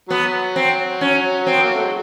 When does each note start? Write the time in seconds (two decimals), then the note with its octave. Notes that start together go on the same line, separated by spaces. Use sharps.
0.09 F#3 B3
0.56 C4
1.01 C#4
1.47 C4
1.55 B3
1.63 A#3
1.73 A3
1.82 G#3